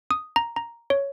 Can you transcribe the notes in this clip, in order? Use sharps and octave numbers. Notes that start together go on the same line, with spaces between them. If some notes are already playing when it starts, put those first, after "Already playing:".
D#6
A#5
A#5
C#5